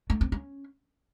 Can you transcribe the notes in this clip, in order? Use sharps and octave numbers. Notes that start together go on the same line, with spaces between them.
A3
C4
C#4